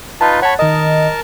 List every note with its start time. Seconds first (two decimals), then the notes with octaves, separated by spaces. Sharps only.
0.21 D#4 F4 B4 A5
0.42 C#5 F#5 A5 B5 C#6
0.59 D#3 A#4 D#5 A5